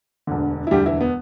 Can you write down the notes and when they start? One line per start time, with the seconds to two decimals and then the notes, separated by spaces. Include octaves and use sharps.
0.27 E1 D2 D3
0.67 E4
0.71 E1 D2 D3 G3 G4
0.86 E3 E4
1.01 B3